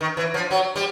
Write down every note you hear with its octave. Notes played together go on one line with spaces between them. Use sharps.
D#3
E3
F3
F#3
G3